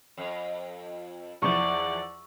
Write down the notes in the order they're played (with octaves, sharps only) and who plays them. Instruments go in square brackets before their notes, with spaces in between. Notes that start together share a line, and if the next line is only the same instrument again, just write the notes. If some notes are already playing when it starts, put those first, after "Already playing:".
[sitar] F2
[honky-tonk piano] E2 F3 E4 [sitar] E3 [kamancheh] D5 F#5 [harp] C#6